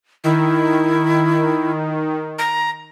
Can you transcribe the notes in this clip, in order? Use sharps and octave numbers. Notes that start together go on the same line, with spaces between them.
D#3 E4
A#5